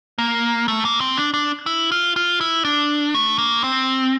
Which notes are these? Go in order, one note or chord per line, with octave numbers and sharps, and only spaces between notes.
A#3
A3
A#3
C4
D4
D4
E4
F4
F4
E4
D4
A3
A#3
C4